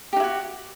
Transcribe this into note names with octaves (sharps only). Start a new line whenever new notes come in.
D#4 E4 F#4 G4